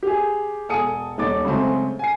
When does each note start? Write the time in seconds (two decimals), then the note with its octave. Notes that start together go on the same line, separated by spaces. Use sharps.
0.03 G4 G#4
0.69 E1 A4 G#5 D#6 C#7 D#7
1.18 D#1 D#4 C#5 D6 A6
1.45 C#3 F#3 G#3 A3 C4
1.99 G#5 C7